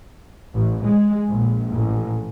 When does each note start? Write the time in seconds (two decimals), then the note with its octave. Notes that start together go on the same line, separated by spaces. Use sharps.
0.54 A1
0.84 G#3
1.26 A#1
1.73 A1